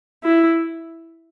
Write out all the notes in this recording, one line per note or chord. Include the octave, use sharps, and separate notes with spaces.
E4